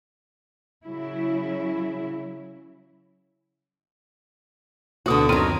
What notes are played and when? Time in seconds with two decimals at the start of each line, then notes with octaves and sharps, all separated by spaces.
0.84 C#3 F#3 E4
5.06 D2 B2 D3 B3 F#4
5.29 F#2 D#3 F#3 C4 F6